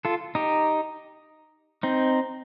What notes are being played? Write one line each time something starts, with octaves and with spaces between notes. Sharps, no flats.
F4 A4
D#4 G4
C4 D#4